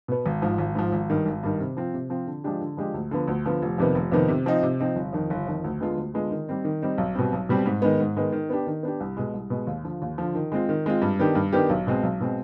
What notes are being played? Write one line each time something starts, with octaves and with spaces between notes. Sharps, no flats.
B2 B3
G#1
G#2 F3
G#1
G#2 F3
G#1
G2 D#3
G#1
G2 D#3
C3
F3 C4 F4
C3
F3 C4 F4
D3
F3 G#3 D4 G4
D3
F3 G#3 D4 G4
D2
D3 F3 B3
D2
D3 F3 B3
F1
F2 C3 D#3 B3
F1
F2 C3 D#3 B3
C3
F3 C4 D#4
C3
F3 C4 D#4
G1
F2 D#3
G1
F2 D#3
D2
D3 G#3 B3 F4
D2
D3 G#3 B3 F4
D#3
G3 C4 D#4
D#3
G3 C4 D#4
B1
B2 G3 C4
B1
B2 G3 C4
G#2
D#3 G#3 B3
G#2
D#3 G#3 B3
D#3
B3 D4 G4
D#3
B3 D4 G4
C2
B2 G#3
C2
B2 G#3
D#2
D3 F3
D#2
D3 F3
D#3
G#3 C4 F4
D#3
G#3 C4 F4
G2
D#3 B3 D4 G4
G2
D#3 B3 D4 G4
B1
B2 G#3 C4
B1
B2 G#3 C4